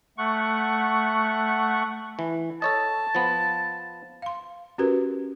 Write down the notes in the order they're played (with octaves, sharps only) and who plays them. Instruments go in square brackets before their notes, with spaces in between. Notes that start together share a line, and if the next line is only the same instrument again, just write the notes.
[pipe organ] A3 F#5 C#6
[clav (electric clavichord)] E3
[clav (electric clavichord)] A4 C#5 D#5 [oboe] A5
[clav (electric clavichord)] F3 B3
[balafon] F5 C6
C#4 F#4 G4 A#4 B4